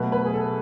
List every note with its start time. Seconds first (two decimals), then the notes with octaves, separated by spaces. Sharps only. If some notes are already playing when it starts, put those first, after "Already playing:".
Already playing: B2 F#3 A3 B4
0.12 B4
0.25 G#4
0.34 A4